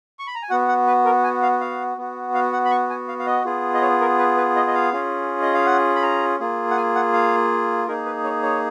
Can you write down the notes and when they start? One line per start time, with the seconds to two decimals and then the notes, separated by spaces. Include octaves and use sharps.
0.19 C#6
0.27 B5
0.35 A#5
0.42 G#5
0.50 B3 F#4 F#5
0.68 F#5
0.87 B4
1.05 A#4
1.24 G#5
1.42 F5
1.61 F5
1.98 B3 F#4
2.35 F5
2.53 F#5
2.65 B5
2.71 C#6
2.90 G#5
3.08 F5
3.19 F5
3.26 D#5
3.45 B3 F4 G#4
3.74 D#5
3.82 C#5
4.01 A#4
4.19 B4
4.37 B4
4.56 D#5
4.67 D#5
4.74 F5
4.93 C#4 F4 G#4
5.42 D#5
5.54 F5
5.66 F#5
5.95 B5
6.03 A#5
6.40 A#3 F4 G#4
6.71 F#5
6.77 G#5
6.95 F#5
7.14 F5
7.87 A#3 D#4 G#4 A#4
8.06 B4
8.24 C#5
8.43 C#5